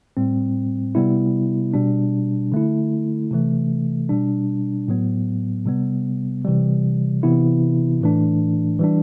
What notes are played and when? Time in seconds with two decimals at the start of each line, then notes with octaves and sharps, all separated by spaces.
0.17 A2 G3 C4
0.95 C3 G3 B3 E4
1.74 B2 G3 D4
2.52 D3 A3 E4
3.31 C3 E3 A3
4.09 B2 G3 D4
4.88 A2 F#3 B3
5.66 C3 G3 B3
6.44 C3 E3 G3
7.23 C3 E3 B3 E4
8.01 A2 E3 A3 D4
8.79 E3 G3 D4